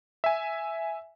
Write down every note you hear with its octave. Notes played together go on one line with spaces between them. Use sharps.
E5 G#5